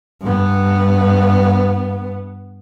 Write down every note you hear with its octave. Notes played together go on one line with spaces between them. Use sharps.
G2 B3